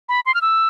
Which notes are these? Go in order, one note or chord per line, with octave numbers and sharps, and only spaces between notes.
B5
C6
F6
E6